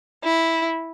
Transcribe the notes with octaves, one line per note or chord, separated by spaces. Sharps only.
E4